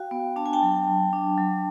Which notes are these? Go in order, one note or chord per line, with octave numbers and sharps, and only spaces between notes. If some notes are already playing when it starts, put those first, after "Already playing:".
Already playing: F#4 F5 G5
B3
D4 A5
G#5
G5 A5
F#3
F#3
D4
F#3